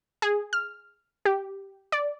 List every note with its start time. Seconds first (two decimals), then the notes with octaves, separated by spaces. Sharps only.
0.22 G#4
0.53 F6
1.25 G4
1.92 D5